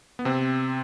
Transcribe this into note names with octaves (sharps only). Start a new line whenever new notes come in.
B3
C3 C4